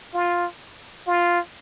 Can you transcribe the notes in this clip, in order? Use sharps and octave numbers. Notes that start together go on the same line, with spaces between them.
F4
F4